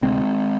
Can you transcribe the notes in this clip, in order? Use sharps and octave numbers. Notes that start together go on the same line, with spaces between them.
D2 C3 G#3 C4